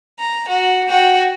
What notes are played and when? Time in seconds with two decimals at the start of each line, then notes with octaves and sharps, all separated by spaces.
0.19 A#5
0.48 F#4
0.88 F#4 G5